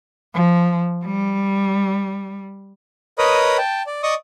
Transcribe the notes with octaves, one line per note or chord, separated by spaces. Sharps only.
F3
G3
A#4 B4 C#5 D#5 B5 D#6
G5 A5
D5
D5 D#5 C#6 D#6